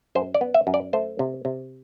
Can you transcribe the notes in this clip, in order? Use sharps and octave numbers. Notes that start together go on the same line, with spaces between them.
F#2 C5
D5
B3
E5
F#2
D5
A3 C5
C3
C3